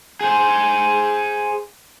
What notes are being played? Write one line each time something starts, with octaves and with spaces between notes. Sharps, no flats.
G#4 C5